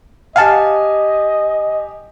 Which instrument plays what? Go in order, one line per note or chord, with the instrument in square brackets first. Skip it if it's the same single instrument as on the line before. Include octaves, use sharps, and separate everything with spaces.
[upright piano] G4 G#5 [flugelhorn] D#5 [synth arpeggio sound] F5 F#5 A5